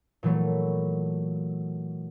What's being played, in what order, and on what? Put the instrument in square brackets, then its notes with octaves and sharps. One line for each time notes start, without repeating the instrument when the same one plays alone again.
[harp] A#2 E3 F#3 A3